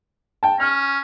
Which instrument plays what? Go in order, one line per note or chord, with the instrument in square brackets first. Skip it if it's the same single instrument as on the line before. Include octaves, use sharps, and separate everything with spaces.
[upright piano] G5 A5
[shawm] C#4 [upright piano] F6